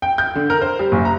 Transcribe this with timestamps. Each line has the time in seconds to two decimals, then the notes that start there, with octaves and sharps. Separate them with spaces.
0.02 G5
0.18 G6
0.35 D3
0.50 A#4
0.61 C5
0.79 G3
0.92 F#1
1.05 A#5